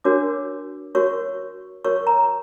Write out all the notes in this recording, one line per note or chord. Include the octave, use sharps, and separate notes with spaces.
D4 F#4 A#4 C#5 D6
F#4 A#4 C#5 C#6
F#4 A#4 C#5 C#6
A#5